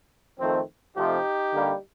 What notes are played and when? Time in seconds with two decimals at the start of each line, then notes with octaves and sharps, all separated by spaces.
0.40 F2 D#3 A3 C4
0.97 F2 C3 F3 A3 D#4 G4
1.53 D3 G3 A#3